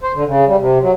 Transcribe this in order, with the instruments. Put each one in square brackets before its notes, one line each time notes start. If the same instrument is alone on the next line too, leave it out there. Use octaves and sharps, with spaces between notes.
[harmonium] C5
D3
C#3
G3
C3
F#3